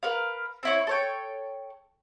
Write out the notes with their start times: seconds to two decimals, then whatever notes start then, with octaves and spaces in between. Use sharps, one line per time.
0.03 A#4 B4 F5
0.63 C4 E4 C#5
0.87 A4 C#5 G5